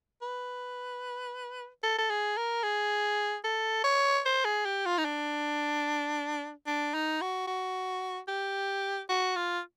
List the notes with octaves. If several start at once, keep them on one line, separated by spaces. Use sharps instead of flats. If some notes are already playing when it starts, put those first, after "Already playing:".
B4
A4
A4
G#4
A#4
G#4
A4
C#5
C5
G#4
G4
F4
D#4
D4
D4
D#4
F#4
F#4
G4
F#4
F4